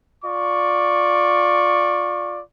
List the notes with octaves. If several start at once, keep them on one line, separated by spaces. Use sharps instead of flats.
F4 D5 C#6